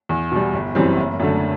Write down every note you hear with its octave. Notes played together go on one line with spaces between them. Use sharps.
E2
B2 G3
G1
F#2 E3 G3 C4
F#1
F#2 D3 A3